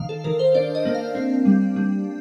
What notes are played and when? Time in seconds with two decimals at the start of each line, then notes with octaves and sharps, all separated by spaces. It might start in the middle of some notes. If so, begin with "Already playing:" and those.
Already playing: D#3 F5
0.09 A4
0.24 D#3 A#4
0.39 C5
0.54 D4 D5
0.75 D#5
0.85 A#3
0.95 F5
1.15 C4
1.45 G3
1.76 G3